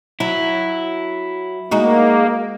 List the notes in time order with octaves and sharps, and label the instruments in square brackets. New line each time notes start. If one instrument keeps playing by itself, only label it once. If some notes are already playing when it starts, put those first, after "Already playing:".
[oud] F#3 [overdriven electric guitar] E4
[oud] G#3 D#4 F#4 [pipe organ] A#3